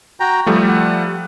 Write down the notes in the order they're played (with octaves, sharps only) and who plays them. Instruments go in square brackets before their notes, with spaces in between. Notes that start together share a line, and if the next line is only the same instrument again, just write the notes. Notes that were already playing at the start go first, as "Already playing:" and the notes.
[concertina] F#4 G5 A#5
[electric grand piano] F3 G3 A3 [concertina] B3
[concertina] F#5